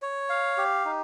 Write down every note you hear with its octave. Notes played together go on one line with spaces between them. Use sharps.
C#5
F5
G4
D#4